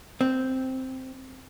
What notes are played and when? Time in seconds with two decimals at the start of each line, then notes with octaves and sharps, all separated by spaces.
0.21 C4